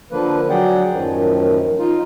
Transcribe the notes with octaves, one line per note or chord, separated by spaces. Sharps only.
D3 F3 A#3 B4
F#3 G#4 D5 F#5 G5
F#2 A2 D#3 F3
D#4 F4